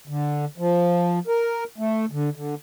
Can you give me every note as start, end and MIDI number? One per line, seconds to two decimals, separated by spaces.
0.07 0.45 50
0.58 1.19 53
1.28 1.64 70
1.78 2.05 57
2.11 2.29 50
2.35 2.55 50